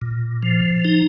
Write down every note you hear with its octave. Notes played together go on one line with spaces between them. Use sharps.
A#2
F3
D#4